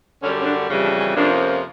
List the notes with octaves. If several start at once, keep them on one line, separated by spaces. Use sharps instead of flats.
F#2 D3 G3 C#4
C#4
D4
F2 C#3 E3 G3
D4
C#4
F2 C3 F3 A#3 C#4 D4